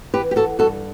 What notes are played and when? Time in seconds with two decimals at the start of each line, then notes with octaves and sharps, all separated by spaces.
0.14 E3 G4 B4
0.31 G4
0.36 F#4 A4
0.59 G2 F#4 A4